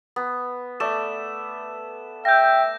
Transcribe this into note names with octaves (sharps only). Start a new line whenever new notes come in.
B3
A3 D5 E7
E5 G5 G6 A#6